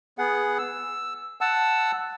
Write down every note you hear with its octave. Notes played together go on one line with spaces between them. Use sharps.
B3 G#4 F#5
E6
F#5 A5 E6